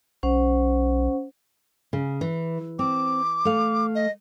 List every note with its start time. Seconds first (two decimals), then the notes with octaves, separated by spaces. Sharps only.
0.23 B1 C#4 C5 F#5
1.93 C#3
2.21 E3
2.79 C4 D6
3.45 A3 F5
3.95 D#5